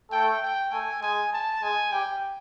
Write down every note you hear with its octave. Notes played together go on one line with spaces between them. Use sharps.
A3 A4 G5
G5
A3 A4 G#5
G#3 G#4 G#5
A5
G#3 G#4 G#5
G3 G4 G5